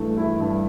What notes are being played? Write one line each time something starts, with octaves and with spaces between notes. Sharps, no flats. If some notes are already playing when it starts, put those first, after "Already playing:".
Already playing: G2 E3 A3
E4
G2